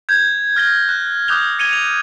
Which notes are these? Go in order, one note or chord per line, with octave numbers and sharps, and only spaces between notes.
G6 G#6
F6 A#6 G7
F#6
D6 D#6 F#6 G6 F7 G7
G#6 C#7 D#7 F7 G7
F7